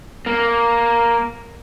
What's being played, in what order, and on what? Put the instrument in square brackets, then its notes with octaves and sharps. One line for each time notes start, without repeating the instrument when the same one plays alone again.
[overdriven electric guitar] A#3